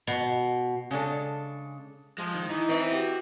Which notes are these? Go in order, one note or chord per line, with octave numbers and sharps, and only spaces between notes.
B2
C#3 G#3 D4 A4
F3 G#3
D#3
E3 D#4
E3 C4
F#4 G4